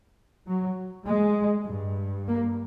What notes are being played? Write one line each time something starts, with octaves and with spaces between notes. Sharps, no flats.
F#3
G#3
G2
A#3